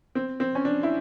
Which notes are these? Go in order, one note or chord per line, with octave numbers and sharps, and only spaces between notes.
C4
C4
C#4
D4
E4